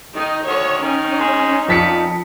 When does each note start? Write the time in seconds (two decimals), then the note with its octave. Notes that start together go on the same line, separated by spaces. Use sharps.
0.15 D#3 D#4
0.45 D2 D#3 C#5
0.82 D#3 C#4 D#4
1.20 G#3
1.68 F2 A#2 B6 C#7